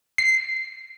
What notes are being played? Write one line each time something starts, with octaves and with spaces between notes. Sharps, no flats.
C7